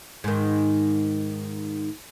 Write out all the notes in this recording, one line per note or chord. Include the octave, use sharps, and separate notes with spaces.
G#2 D#3